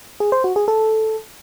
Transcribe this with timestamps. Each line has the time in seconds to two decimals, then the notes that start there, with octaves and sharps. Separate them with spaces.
0.20 G#4
0.32 C5
0.44 F#4
0.56 G#4
0.68 A4